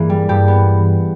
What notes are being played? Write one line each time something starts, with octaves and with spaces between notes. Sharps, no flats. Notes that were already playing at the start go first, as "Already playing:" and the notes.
Already playing: G2 E3 A#3 G#4
G3
G2 G4
B3